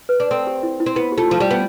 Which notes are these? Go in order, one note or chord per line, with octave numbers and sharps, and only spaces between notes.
B4
D4
C4 A4
G4
E4
E4
C4
B3 E4
G4
A3 F4
F3
G3 G4
B3